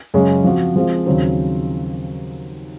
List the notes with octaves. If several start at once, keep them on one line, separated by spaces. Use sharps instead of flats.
F#2 C#3 G#3 C#4
F3 C4 F#4
F3 G#3 C4 F4
D#2 C#3 F#3 C4